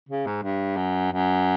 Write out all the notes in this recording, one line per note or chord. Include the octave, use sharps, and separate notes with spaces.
C#3
G#2
G2
F#2
F#2